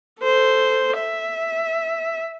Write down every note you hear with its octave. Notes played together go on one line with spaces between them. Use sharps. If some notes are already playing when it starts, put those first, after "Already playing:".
A4 C5
E5